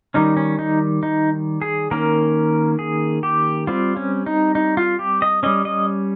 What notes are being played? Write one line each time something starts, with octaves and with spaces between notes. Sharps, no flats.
D#3 G3 C#4 D#4
C#4
D#4
D#4
G#4
D#3 A#3 C#4 A#4
G#4
G4
G3 C4 F4
C#4
D#4
D#4
F4
G4
D#5
G3 C#4 D#5
D#5